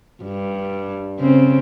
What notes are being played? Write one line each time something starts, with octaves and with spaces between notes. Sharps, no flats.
G2
C#3 C4